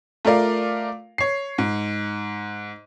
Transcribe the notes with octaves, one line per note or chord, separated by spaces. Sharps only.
A3 F4 A#4 D5 F5
C#5 C7
G#2